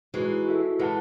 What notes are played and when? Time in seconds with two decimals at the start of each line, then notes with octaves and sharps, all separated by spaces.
0.14 E3 G#3 D#4 F#4 B4
0.46 F#4 A4 E5
0.79 E3 G#3 E4 B4 F#5 A5